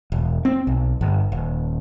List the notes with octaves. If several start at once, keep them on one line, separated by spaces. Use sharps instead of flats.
E1
C4
B1
G1
D#1